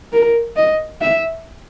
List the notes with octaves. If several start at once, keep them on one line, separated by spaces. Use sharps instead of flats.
A#4
D#5
E5